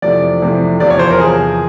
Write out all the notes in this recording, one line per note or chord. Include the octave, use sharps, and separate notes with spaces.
F2 C3 E3 A3 D5
F2 C3 E3 A3
E2 C3 F3 D5
C#5
C5
A#4
E2 C3 F3 G#4